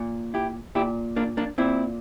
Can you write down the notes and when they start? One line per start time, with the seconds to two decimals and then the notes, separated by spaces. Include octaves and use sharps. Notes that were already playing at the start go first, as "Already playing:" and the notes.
Already playing: A#2
0.34 E4 G4
0.75 A#2 E4 G4
1.16 A#3 D4
1.37 A#3 D4
1.58 A#2 C4 E4